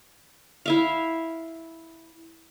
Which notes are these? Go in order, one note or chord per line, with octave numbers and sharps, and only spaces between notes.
E4 E5 F5